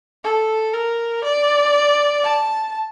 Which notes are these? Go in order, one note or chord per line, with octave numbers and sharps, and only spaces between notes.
A4
A#4
D5
A5